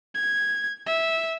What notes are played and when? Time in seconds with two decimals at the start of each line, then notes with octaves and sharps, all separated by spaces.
0.15 G#6
0.86 E5